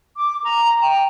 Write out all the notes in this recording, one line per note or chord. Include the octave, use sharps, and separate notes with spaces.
D6
A#5
G5